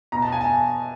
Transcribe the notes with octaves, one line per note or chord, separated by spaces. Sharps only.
B2 A#5
A5
G#5
A5